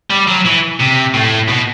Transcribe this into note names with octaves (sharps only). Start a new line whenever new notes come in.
G3
F#3
E3
C3
A2
B2